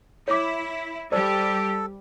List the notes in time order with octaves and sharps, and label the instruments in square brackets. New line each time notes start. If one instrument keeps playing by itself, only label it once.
[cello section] E4 [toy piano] C#5 D6
[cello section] G3 G4 [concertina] A4 [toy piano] C5 D5